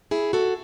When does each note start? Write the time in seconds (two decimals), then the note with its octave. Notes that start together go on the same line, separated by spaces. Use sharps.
0.11 E4 G#4
0.33 F#4 A4